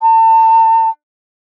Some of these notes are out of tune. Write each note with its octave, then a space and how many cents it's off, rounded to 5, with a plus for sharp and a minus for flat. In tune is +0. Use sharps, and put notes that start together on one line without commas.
A5 +35